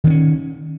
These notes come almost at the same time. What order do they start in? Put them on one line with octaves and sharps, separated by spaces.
D#3 C4 C#4